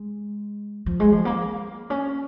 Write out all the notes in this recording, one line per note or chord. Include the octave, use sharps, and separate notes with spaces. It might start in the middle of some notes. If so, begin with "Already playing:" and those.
Already playing: G#3
F3
G#3
F3
A#3
C#4